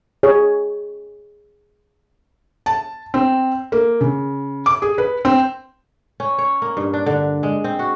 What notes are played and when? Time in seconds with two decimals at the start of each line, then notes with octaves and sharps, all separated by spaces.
0.23 G#4 C#5
2.66 A5
3.14 C4
3.72 A#3
4.01 C#3
4.66 D6
4.82 G#4
4.98 B4
5.25 C4
6.20 C#4
6.38 C#5
6.62 A#3
6.77 G2
6.94 D4
7.06 D3
7.43 G#3
7.64 C4
7.79 F#4